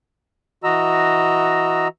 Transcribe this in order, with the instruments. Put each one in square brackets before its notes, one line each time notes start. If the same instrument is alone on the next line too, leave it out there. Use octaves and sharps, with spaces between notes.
[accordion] E3 F#4 D#5 A#5 E6